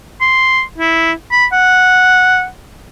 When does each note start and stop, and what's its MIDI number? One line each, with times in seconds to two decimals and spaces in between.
0.21 0.62 84
0.78 1.12 64
1.31 1.46 83
1.53 2.46 78